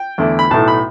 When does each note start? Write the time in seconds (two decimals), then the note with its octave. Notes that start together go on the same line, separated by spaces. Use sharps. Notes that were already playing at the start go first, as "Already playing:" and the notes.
Already playing: G5
0.18 E2 D3 A3 E4
0.39 B5
0.50 B1 A2 A3 A5
0.68 B5